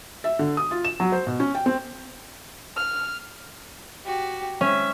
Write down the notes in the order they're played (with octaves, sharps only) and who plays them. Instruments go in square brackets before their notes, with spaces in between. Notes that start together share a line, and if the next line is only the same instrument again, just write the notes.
[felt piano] E5
D3
D#6
F4
E7
F#3
C5
B2
C#4
G5
C4
[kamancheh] F6
[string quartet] F#4 G4
[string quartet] G#3 E5 [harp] C#4